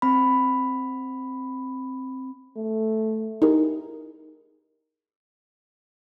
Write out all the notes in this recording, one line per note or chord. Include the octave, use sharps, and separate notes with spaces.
C4 B5
A3
D#4 E4 G4 G#4 A#4